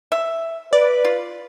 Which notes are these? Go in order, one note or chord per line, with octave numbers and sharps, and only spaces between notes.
E5
B4 D5
F4